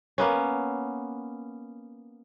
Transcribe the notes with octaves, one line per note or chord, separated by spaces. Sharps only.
A#3 B3 C#4